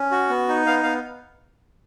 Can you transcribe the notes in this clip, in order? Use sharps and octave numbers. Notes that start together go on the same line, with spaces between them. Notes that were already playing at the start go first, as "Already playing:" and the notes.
Already playing: C#4
F#4
B3
D#4
B3 F5
B3 F5